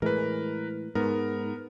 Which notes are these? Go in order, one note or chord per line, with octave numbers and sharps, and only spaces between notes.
A2 E3 G#3 A#4 B4
G#2 B3 A#4